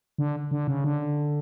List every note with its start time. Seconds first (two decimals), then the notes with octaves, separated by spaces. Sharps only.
0.18 D3
0.51 D3
0.67 C#3
0.84 D3